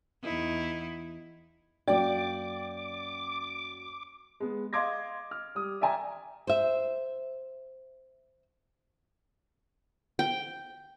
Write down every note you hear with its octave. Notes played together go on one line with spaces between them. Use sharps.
E2 D#4 E4
F#2 F#3 A#3 D5 G5 D6
G#3 B3
D#5 F5 C6 D6 G#6 A#6
F6
G3 D#6
D5 E5 G5 G#5 A#5
C5 E5
G5